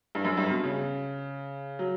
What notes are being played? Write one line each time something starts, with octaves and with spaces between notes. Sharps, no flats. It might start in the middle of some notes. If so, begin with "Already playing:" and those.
G2
F#2
G2
B2
C#3
F#3